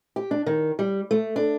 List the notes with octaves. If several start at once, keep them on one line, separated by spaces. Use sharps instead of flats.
G4
D4
D#3
G3
A3
D4